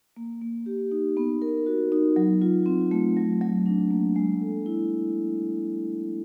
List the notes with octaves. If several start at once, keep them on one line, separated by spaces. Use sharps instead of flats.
A#3
A#3
G4
D#4
B3
A#4
F#4
D#4
F#3
F4
C4
A3
F#3
F#3
D4
A#3
G#3
A4
E4